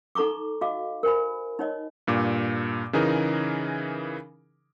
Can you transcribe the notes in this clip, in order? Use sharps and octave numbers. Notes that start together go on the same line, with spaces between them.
D#4 A4 A#5 C#6 D6
F#4 D#5 F5 D6
A#4 C5 G#5 B5
D#4 C#5 D#5
G2 A#2 D6
C#3 E3 D#4 G#4 A#4